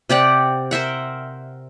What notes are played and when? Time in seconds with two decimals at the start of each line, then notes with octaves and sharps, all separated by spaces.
0.09 C3 G4 D5 F#5
0.71 A#4 C5 E5 F#5